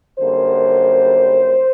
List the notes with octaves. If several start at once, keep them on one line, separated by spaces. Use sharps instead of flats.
F#2 D3 G3 A#3 C5